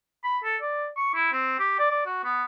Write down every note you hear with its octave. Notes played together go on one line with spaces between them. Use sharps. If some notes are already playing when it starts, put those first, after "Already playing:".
B5
A4
D5
C#6
E4
C4
G4
D5
D5
F#4
B3